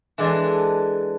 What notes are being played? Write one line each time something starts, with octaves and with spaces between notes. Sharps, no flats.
E3 G#3 D4 A4